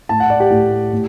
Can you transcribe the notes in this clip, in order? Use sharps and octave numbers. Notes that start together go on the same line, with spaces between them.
A2 A5
F#5
D5
G4
A2
A2